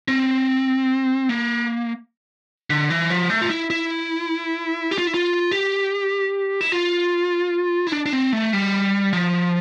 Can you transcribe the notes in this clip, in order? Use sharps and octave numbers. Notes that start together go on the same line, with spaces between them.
C4
A#3
D3
E3
F3
A3
F4
E4
E4
G4
F4
E4
F4
G4
E4
F4
E4
D4
D4
C4
A3
G3
F3